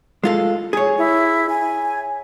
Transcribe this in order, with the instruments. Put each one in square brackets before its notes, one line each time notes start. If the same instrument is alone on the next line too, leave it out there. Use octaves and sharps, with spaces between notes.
[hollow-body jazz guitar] G#3 F4 A4
G#4 C#5
[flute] E4
G#5